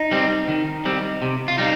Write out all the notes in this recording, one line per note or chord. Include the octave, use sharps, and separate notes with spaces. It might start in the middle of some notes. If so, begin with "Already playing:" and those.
Already playing: D#4
G3 C4
D#3
G3 C4
C3
F4
G3 D#4